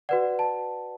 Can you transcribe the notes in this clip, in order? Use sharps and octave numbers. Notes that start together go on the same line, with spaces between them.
F#4 B4 D5 F#5
A5